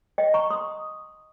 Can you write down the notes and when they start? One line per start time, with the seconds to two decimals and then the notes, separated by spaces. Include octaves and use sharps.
0.18 D#5 G5
0.34 A#5 C#6
0.50 C6 D#6